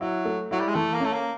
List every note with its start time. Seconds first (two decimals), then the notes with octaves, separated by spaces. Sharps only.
0.01 F#3 E4
0.25 A3
0.51 F#3 E4
0.60 G3
0.68 G#3
0.75 E3 A3
0.94 A#3
1.00 A3 C#4
1.13 A#3